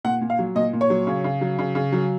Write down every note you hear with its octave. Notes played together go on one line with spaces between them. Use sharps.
A#2 F#5
A#2
F5
F#3
A#2 D#5
A#2
C#5
F#3
C#3
C#3
F#3
C#3
C#3
F#3